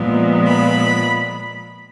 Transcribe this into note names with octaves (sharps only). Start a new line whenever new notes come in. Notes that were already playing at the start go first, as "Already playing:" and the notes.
Already playing: A#2 F3 G#3 B3
B5